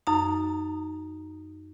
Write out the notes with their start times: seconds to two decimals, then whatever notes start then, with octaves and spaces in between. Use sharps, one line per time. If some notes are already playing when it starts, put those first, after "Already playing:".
0.07 F#2 D#4 A#5